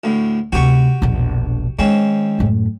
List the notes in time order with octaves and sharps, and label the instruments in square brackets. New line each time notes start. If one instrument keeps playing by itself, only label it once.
[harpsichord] D2 A2
[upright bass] D2 C3 [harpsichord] F#4 G4 C#6
[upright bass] E1 A#1
[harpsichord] G#2 C4 C#4 [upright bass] D#3
[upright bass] F#2 A2